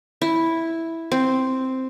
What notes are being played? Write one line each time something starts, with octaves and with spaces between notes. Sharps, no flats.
E4
C4